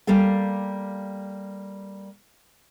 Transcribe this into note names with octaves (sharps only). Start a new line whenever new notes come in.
G3 A#3 G4 A4 F5